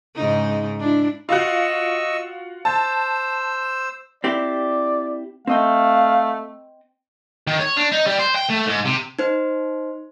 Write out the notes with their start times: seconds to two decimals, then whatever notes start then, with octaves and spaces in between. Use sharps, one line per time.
0.15 G#2 C#3 D#4
0.79 D4 E4
1.29 F4 F#4 D#5 C#6 E6
2.65 C5 A5 E6
4.24 C4 E4 G4 D5
5.47 A3 C4 D#5 F5 G5
7.47 D#3
7.60 C#5
7.77 D4
7.92 D#4
8.07 G3
8.20 C5
8.36 G5
8.50 A3
8.68 G#2
8.86 C3
9.19 D#4 C5